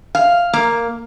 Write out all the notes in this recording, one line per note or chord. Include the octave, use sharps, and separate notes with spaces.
F5
A#3